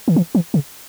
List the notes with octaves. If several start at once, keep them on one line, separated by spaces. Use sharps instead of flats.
D#3
E3
E3
C#3